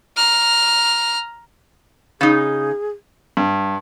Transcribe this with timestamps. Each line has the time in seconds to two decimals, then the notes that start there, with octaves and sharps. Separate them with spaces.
0.17 A#5 F6
2.21 C#3 D#4 G#4
3.37 G2